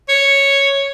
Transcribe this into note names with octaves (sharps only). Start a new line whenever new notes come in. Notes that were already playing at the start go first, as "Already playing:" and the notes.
C#5